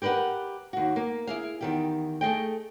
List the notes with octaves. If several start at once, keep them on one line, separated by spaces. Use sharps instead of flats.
G4 A#4 B4 D5 F#5
D#2 F#4
A#3
E4 G#4 F5
E2 D#3 G4
A3 G#4 D#5 G5